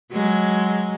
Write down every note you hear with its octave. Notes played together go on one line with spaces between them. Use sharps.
F#3 G#3